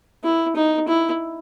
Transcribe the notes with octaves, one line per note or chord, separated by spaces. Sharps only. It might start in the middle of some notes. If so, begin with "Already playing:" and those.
E4
D#4
E4